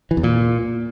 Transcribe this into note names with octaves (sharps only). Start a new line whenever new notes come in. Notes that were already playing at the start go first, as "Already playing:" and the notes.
E3
E2
A#2